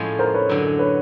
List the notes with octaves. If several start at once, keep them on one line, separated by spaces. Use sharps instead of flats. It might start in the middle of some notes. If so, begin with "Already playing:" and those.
Already playing: A2 F3 G#3 C#4
A#4 C5
B4 C#5
F#2 D3 F#3
B4 C#5